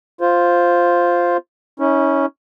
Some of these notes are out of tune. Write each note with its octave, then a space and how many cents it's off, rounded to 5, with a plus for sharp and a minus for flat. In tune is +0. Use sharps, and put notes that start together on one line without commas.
F4 +0 C5 +0
C#4 +0 E4 -45